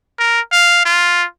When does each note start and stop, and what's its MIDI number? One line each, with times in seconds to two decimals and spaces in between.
0.19 0.41 70
0.52 0.83 77
0.86 1.25 65